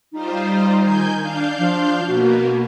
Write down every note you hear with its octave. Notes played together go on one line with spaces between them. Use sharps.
G3 D#4 F4 C5
D#3 G#5 G6
D4 F5 G6
F3
B2 A#3 B3 F#4